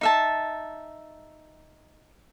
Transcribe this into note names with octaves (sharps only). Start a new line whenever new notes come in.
D#4 E5 A5